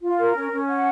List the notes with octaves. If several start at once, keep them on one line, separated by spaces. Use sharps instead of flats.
F4
A#4
C#4
C#4
F#5